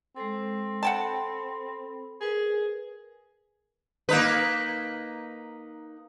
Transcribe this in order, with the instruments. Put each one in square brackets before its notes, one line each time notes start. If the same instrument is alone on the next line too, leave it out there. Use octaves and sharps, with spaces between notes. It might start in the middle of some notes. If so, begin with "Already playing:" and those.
[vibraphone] G#3 A4 [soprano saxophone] C4
[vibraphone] A4 B5 [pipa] F#5 G5 A5
[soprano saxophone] G#4 [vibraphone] A#4 B4
[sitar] A#3 D#4 B4